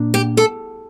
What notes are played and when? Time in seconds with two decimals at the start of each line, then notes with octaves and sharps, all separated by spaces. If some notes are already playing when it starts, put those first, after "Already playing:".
Already playing: A#2 A#3 D4
0.14 G4
0.37 A4